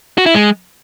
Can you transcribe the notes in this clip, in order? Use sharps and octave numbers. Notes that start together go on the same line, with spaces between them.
F#4
E4
G#3